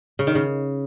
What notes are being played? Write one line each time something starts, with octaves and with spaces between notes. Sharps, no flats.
C#3
D#3
C#3